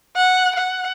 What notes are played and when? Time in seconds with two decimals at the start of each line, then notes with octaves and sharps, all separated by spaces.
0.16 F#5
0.56 F#5